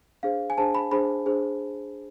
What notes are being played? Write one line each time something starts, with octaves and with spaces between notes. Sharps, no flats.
D4 G#4 C5 F5
G#5
D4 G#4 C5 A5
B5
D4 G#4 C5 B5
D4 G#4 C5